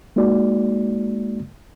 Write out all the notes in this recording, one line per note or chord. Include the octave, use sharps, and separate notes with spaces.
G#3 A#3 D#4 F#4 D5